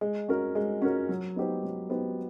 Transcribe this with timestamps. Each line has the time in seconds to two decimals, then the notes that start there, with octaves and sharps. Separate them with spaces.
0.01 G#3
0.29 C#4 F#4 A#4
0.55 G#3
0.82 C#4 F#4 A#4
1.09 F#3
1.36 B3 D#4 G4 C5
1.63 F#3
1.89 B3 D#4 G4 C5